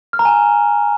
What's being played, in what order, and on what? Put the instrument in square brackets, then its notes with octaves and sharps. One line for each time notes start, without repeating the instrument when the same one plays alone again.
[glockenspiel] F6
A#5
G#5